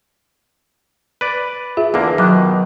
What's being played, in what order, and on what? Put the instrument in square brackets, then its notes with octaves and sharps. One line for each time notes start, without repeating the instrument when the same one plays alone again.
[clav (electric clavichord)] B4 D5
[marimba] F4 G#4 E5
[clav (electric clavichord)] E2 D3 A#3
[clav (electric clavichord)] B2 D#3 [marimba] F#3 D6 F#6